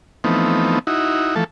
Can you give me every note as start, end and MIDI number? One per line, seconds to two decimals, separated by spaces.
0.24 0.79 52
0.24 0.79 53
0.24 0.79 57
0.24 0.79 59
0.24 0.79 60
0.24 0.79 63
0.87 1.35 63
0.87 1.35 64
0.87 1.35 66
1.36 1.44 52
1.36 1.44 53
1.36 1.44 57
1.36 1.44 69